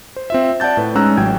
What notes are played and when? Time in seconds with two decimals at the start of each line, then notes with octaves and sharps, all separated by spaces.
0.16 C5
0.30 C4 F4 E5
0.60 D5 F#5 A5 G6 A6
0.77 A2 B4
0.95 G#3 C#4 D#4 A#5 E6 F#6
1.17 A1 F#3 G5 G#6